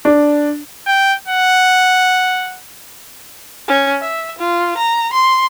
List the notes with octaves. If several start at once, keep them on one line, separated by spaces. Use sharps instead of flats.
D4
G5
F#5
C#4
E5
F4
A#5
C6